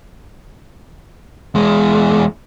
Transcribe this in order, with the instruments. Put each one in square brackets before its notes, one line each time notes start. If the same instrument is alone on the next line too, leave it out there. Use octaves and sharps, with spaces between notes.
[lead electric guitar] E2 G#3